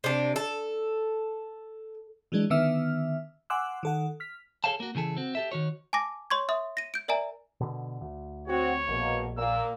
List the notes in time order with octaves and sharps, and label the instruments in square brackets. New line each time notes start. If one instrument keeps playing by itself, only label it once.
[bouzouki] C3 D4
A4
[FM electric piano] E3 F#3 G#3 D4
D3 D#3 B3 E5 E6 F6
F#5 G#5 C6 D6 E6 F#6
D#3 A4 F#5
F6 B6
[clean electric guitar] G#4 A4 C#5 F5 F#5 A5
A#3 F#4
C#3 E3 G#4 A4
C4 F#4
G4 A4 E5
D#3 F#4 C#5
[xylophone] G#5 A5 D6 A#6
C#5 C6 C#6 G#6
E5 C6 D#6
A#6 D#7
G6 D7
A#4 D5 E5 G#5 A#5
[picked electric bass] B2 D3
D2
[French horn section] C4 F#4 [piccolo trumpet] C#5
[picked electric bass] A#1 [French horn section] B2 A#3
[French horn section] A#2 A#3 [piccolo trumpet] E6